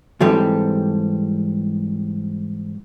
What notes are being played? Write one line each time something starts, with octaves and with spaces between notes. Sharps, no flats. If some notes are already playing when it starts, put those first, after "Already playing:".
G#2 E3 G3 C4 G4 A4